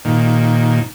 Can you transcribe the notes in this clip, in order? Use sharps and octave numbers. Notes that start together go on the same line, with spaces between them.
A#2 D#3